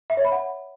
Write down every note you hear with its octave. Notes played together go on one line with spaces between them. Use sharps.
E5
C#5
B5
F#5